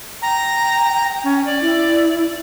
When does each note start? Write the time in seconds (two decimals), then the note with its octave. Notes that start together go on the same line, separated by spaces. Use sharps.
0.22 G5 A#5
1.24 C#4
1.46 D5
1.61 E4